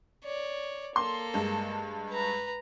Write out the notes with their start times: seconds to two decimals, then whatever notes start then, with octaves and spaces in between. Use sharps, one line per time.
0.24 C#5 D5
0.96 A#3 A4 C6
1.34 G2 G#3
2.10 B4 A#5